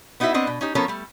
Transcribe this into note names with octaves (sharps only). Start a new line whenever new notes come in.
B3 D#4 E4 F#4 E5
B3 C4 D4 D#5
B2
C#4 D#4 G4
F3 B3 C#4 A4 A#4 C#5
G3 A3